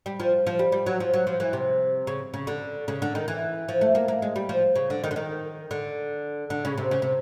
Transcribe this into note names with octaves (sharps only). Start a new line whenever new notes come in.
G3
F3
F3
G3
G3
F#3
F3
F#3
F3
E3
C3
C#3
C#3
D3
C#3
D3
D#3
E3
F3
A3
A#3
A#3
G#3
G3
F3
C#3
D3
D#3
D3
D#3
D3
D3
C#3
C3
C#3
C3